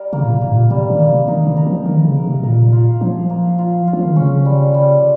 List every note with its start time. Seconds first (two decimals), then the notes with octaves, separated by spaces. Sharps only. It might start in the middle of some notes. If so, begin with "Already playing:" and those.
Already playing: G3 A#4
0.13 C#3 A#3
0.23 A#2
0.32 C3
0.41 G#2 A#3
0.51 A#2
0.70 C3 G3
0.90 D#3
0.99 A#3
1.09 C3
1.28 D#3 D#4
1.47 D#3
1.57 A#4
1.66 F3
1.86 D#3 A#4
2.05 C#3
2.14 A#4
2.24 C3
2.43 A#2 A#4
2.72 F4
3.01 F3 A#3
3.30 A#3
3.58 F4
3.87 F4
3.93 F3
4.05 D#3
4.16 C#3 C#4
4.45 G3
4.74 G3